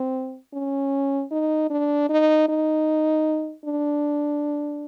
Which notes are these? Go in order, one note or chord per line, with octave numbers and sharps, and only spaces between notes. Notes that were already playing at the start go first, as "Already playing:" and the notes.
Already playing: C4
C#4
D#4
D4
D#4
D#4
D4